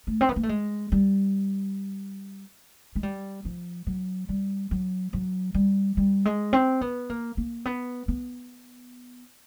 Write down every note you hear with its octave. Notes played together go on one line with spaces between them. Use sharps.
A3
C4
B3
A#3
A3
G#3
G3
G#3
G3
F3
F#3
G3
F#3
F#3
G3
G3
G#3
C4
B3
A#3
A#3
B3
B3